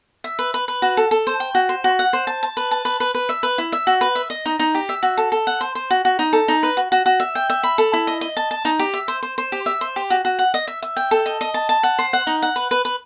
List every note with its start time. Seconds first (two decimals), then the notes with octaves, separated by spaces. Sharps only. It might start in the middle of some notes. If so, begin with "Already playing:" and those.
0.24 E5
0.39 B4
0.54 B4
0.68 B4
0.82 F#4
0.97 A4
1.11 A4
1.27 C5
1.40 G5
1.55 F#4
1.69 C5
1.84 F#4
1.99 F#5
2.13 C5
2.27 A5
2.43 A5
2.57 B4
2.71 A5
2.85 B4
3.00 B4
3.15 B4
3.29 E5
3.43 B4
3.58 E4
3.72 E5
3.87 F#4
4.01 B4
4.15 E5
4.30 D#5
4.46 D#4
4.59 D#4
4.75 G4
4.89 E5
5.03 F#4
5.17 A4
5.32 A4
5.47 F#5
5.61 C5
5.75 C5
5.90 F#4
6.05 F#4
6.19 D#4
6.33 A4
6.48 D#4
6.63 B4
6.77 F#4
6.92 F#4
7.06 F#4
7.20 E5
7.35 G5
7.50 E5
7.63 B5
7.78 A4
7.93 E4
8.07 D#5
8.21 D#5
8.37 A5
8.51 A5
8.65 D#4
8.79 G4
8.94 E5
9.08 C5
9.23 C5
9.38 C5
9.52 G4
9.66 E5
9.81 C5
9.96 G4
10.10 F#4
10.25 F#4
10.39 F#5
10.54 D#5
10.68 E5
10.82 E5
10.97 G5
11.11 A4
11.26 D#5
11.41 D#5
11.54 A5
11.69 A5
11.83 F#5
11.99 C5
12.13 F#5
12.27 D#4
12.42 F#5
12.56 B4
12.71 B4
12.85 B4